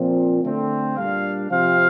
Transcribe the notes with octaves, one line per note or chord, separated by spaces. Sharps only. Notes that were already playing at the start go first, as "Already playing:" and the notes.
Already playing: A#2 F3 C4
D3 A3 C4
A#2 G3 D4 F5
C3 F3 C4 F5